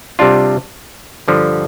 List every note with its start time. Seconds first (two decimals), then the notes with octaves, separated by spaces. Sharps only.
0.19 C3 G3 D4 F4
1.28 G2 D3 F3